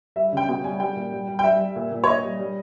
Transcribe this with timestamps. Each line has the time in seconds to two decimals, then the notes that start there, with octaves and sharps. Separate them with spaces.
0.16 G3 E5
0.33 C#3 G5
0.48 B2 G5
0.64 G3 G#5
0.80 G3 G5
0.96 A#2
1.12 G3
1.28 G3
1.39 G5
1.43 G3 E5
1.59 G3
1.76 A#2
1.92 A#2
2.04 C#5
2.07 A#2 D#5
2.23 G3
2.39 G3